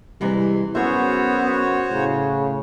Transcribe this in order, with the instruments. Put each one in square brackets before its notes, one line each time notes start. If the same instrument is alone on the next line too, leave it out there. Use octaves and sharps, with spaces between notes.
[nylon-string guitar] C3 E3 G#3 [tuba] G3
[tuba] F#2 [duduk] B3 [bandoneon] F#4 C5 C#5 [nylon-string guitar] G#4 E5
[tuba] A2 [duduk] C#3